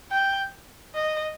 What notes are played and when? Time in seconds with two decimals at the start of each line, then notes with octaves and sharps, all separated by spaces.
0.11 G5
0.95 D#5